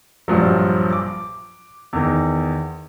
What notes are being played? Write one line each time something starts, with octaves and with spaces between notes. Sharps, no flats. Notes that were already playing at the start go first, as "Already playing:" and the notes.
A#1 G2 F3 F#3
D6
E2 D#3